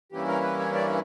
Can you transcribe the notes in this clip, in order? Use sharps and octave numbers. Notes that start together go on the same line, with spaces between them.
G2 E3 A#3 C#4 E4 G4
A#4
B4
C#5
D5